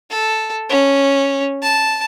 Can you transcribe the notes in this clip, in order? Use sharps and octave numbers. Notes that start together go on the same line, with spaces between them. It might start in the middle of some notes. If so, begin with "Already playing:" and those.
A4
C#4
A5